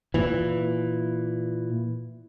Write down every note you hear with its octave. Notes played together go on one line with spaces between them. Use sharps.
A#2 E3